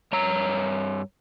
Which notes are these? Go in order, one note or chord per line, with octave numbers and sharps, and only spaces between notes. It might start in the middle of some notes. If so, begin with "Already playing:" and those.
G2 C#5 A#5